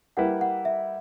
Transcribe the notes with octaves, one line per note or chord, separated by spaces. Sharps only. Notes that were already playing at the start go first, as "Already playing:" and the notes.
G3 A#3 E4 B4 F#5
F#5
E5